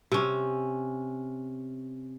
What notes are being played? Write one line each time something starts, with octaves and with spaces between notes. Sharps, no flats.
C3 C#4